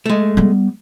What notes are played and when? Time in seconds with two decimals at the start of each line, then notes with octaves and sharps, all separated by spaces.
0.06 G#3 A3
0.37 G3 B3